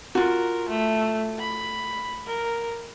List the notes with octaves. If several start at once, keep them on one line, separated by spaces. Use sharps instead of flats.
F4 F#4 A#4
A3
B5
A#4